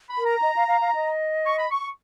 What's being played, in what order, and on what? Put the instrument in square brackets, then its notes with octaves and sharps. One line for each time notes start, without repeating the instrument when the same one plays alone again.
[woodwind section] B5
[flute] A#4
[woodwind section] A#5
[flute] D#5
F5
F5
F5
D#5
[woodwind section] C#6
B5
C#6